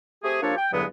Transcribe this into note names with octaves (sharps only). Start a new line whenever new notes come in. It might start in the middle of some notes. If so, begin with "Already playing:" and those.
A3 C4 G4 G#4
F3 A#3 D4 G4 A4 C#5
G5
E2 G2 D3 F#3 G#3 B3